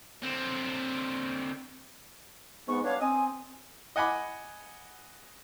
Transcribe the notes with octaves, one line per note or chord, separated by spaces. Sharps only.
D3 C4
G#2 B3 C#6
G3 B3 D4 C#5 F5
C4 G#5 D#6
D#5 F#5 G#5 B5 D6